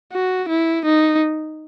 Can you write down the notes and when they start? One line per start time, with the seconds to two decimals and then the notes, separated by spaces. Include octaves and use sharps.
0.12 F#4
0.49 E4
0.85 D#4